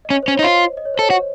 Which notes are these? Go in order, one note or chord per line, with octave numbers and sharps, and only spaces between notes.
D#5
C#4 C#5
C5
C#4
C#5
D#4
F4 C5 D#5
D#5
C#5
C5
A4 C#5
F#4